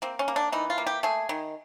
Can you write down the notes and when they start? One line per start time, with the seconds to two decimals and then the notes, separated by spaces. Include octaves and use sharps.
0.02 A#3 C4
0.19 C#4
0.28 A#3
0.36 D4
0.52 E3 D#4
0.70 F4
0.78 A#3
0.87 G4
1.03 A3 G#4
1.29 D#3